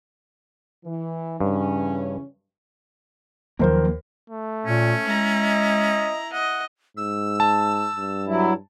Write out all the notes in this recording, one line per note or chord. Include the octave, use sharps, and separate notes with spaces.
E3
G2 C#3 E3 C#4
D#2 F3 F#3 A#3 A#4 C5
A3
A#2 C#4
G#3 E4 A#5
D#5
D#5 F#5
G#2 E6
A5
G2
F#3 E4